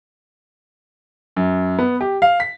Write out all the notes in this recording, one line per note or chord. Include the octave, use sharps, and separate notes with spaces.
F#2
B3
G4
F5
B6